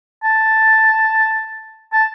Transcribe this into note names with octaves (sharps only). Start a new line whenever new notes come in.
A5
A5